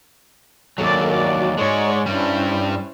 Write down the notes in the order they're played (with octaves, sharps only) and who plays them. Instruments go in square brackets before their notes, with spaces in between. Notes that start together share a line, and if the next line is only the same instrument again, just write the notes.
[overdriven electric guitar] D#2 F#3 [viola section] A4 A#4 D5
[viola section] F#4 D5
[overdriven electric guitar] G#2 G#3 [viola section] C#5 D5
[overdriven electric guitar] G2 G3 [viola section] C#4 E4 C5